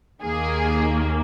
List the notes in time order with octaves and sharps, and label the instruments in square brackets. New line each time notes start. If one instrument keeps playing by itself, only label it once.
[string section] D#2 D#3 A#3 G#4